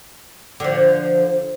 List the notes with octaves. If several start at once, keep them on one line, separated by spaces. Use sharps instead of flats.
D3 F3